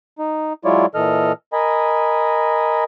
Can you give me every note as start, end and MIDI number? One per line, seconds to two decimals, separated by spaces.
0.19 0.53 63
0.65 0.86 54
0.65 0.86 56
0.65 0.86 64
0.65 0.86 65
0.65 0.86 73
0.65 0.86 74
0.95 1.32 46
0.95 1.32 52
0.95 1.32 69
0.95 1.32 75
0.95 1.32 89
1.53 2.84 70
1.53 2.84 75
1.53 2.84 80
1.53 2.84 83